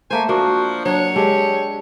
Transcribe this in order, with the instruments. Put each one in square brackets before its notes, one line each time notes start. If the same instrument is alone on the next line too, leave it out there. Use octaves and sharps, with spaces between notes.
[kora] A3 A#3 C5 [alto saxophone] G#5
[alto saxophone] F3 [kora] A#3 D4 [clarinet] F#4
[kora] F#3 [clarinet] D4 [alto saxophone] C#5
[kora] G#3 D4 A4 [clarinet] G4